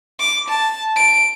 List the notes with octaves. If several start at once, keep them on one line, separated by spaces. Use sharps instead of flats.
D6
A5
D7